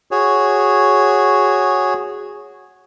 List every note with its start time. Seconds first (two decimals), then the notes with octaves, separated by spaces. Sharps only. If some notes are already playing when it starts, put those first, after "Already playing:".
0.11 F#4 G#4 C#5